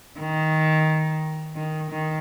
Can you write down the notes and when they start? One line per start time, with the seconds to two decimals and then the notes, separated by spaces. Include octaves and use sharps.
0.19 D#3
1.56 D#3
1.90 D#3